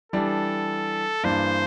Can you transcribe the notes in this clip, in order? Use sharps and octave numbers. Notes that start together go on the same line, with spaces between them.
E3 G3 D4 A4
G2 E3 A#3 D4 C5